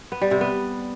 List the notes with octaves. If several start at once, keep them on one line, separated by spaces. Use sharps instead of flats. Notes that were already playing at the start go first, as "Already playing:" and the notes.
B3
G3
C3
B3